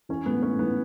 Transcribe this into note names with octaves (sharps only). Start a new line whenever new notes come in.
E3 C#4
A2 B3
A2 C#4
E3 B3